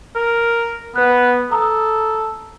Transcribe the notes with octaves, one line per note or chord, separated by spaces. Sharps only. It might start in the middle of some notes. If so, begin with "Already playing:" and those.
A#4
B3 B4 F#6
A4 A#5 D#6